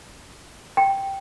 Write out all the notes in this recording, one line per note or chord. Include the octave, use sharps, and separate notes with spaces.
G5